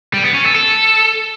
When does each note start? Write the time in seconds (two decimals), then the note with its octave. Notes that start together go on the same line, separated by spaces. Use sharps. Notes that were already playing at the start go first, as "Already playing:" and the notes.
0.14 G3
0.24 B3
0.34 C#4
0.45 A4
0.55 A4